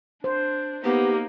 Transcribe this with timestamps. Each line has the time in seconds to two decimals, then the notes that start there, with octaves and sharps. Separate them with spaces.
0.24 D4 C5
0.84 A#3 B3 D#4 G4